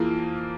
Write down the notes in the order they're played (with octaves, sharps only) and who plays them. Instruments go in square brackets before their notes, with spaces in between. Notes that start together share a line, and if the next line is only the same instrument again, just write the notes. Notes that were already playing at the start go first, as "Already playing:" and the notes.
Already playing: [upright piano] F2 E3 A#3 F4 G#4